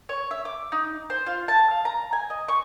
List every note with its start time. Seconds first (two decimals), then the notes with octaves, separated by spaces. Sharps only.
0.09 C#5
0.31 E5
0.45 D6
0.72 D#4
1.10 C5
1.27 F4
1.48 A5
1.71 F5
1.85 A#5
2.13 G#5
2.30 D#5
2.48 C#6